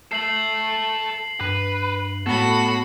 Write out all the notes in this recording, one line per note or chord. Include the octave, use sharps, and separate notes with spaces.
A4 E5 C7 F#7
G2 B4
A2 B3 F#4 A4 B5